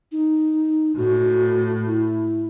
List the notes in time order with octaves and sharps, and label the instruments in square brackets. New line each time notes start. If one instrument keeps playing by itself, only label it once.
[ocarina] D#4
[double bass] A2 [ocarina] F#4
[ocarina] E4